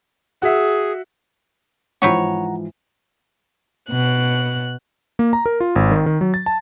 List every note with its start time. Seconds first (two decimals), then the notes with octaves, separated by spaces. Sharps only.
0.42 F#4 G#4 E5
2.02 G#2 E3 F3 C4 B4 C#5 F#5 A#5
3.89 B2 F#6
5.19 A#3
5.33 A#5
5.46 A#4
5.60 F4
5.76 G#1
5.92 D#3
6.06 D#3
6.21 F#3
6.34 A6
6.46 A5